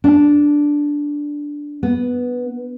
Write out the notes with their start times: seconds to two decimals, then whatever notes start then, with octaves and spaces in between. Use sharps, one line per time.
0.04 D4
1.83 B3